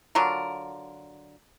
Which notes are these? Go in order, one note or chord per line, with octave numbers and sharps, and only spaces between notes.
D3 F#3 F4 A#4